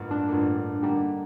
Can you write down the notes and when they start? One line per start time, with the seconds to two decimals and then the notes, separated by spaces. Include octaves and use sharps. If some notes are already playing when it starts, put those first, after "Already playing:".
Already playing: A1 G2 D3 F3 A#3
0.11 D4
0.28 A1 G2 D3 F3 A#3
0.83 D3 G3 A#3 D#4 G4